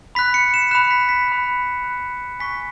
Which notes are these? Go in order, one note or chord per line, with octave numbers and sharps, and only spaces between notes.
B5 F#6 B6
C#7
E7
B5 F#6 E7
B6
B6
B5 F#6
B5 F#6
G#5 C#6 F#6 B6